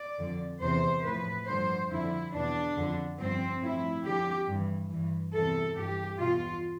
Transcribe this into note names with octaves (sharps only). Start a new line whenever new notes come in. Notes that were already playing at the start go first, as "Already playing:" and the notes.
Already playing: D5
F2 D3 F3
E2 C3 E3 C5
A2 F3 B4
G2 D3 F3 C5
F2 D3 F3 E4
E2 B2 D4
F2 D3 F3
G2 F3 C4
A2 F3 E4
F2 D3 F3 G4
G2 E3
G2 E3
E2 C3 E3 A4
G2 E3 G4
E2 B2 F4